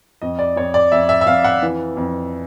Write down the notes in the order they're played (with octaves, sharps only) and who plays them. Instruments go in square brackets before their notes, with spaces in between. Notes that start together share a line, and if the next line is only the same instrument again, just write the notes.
[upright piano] F2 D#5
D5
F2 C#5
D5
F2 E5
E5
E5
F2 F5
F#5
E3
F2